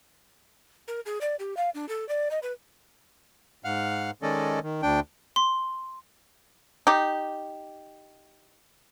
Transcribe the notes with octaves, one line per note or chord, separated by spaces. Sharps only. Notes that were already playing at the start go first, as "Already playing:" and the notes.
A#4
G#4
D5
G4
F5
D4
A4
D5
D#5
B4
G#2 F5 F#5 F6
D#3 G#3 C#4 A4 D5 D#5
D#3
D2 D4 G5
C6
D#4 G4